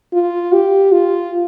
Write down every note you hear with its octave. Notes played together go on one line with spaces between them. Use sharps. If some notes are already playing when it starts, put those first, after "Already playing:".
F4
G4
F4